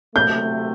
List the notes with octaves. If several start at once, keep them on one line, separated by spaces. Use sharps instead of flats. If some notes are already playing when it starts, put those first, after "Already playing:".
C3 F#3 A3 G6